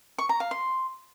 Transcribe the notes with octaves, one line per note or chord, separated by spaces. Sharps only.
C#6
A#5
F5
C6